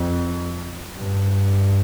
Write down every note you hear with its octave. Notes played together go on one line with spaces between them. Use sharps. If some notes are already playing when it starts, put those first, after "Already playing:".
Already playing: F2
G2